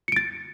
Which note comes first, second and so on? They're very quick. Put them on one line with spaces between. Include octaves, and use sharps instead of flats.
C#7 D7 A6